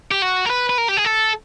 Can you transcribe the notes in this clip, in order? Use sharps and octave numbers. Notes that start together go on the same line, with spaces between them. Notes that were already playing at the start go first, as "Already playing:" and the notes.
G4
F#4
A#4
B4
B4
A#4
G4
G#4
A4